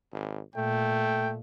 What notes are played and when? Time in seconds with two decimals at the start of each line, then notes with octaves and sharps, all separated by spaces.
0.12 G#1
0.56 A#2 A3 G5